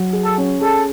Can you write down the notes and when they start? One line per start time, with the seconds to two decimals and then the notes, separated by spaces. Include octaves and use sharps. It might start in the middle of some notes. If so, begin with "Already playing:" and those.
Already playing: F#3
0.13 G#4
0.25 A4
0.38 C#4
0.61 G#4 A4